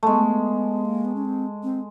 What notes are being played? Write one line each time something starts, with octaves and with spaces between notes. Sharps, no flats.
G#3 A3 B3
A#3
B3
C#4
C4
C4